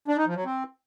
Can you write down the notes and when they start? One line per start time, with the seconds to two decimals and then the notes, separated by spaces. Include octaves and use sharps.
0.08 D4
0.17 D#4
0.27 F3
0.36 F#3
0.45 C4